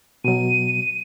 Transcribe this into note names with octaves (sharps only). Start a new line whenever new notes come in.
B2 F#3 D#7